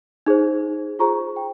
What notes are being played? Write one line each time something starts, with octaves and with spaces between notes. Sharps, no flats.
D#4 G#4 C5
F4 G#4 C5 A#5 C#6
G5